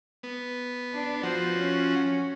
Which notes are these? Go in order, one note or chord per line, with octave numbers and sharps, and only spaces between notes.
B3
D4
F3 F#4 C5
C#4